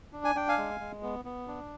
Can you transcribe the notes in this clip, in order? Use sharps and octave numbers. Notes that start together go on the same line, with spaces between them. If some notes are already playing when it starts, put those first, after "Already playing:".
D4
G#5
D4 G5
F5 G#5
G#3
G#3
B3
B3
D4